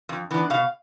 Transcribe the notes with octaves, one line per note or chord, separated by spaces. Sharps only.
F2
E3 B3 D4
B2 F5